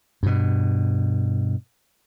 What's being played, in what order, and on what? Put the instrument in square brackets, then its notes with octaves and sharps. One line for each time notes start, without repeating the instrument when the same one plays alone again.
[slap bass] G2 B2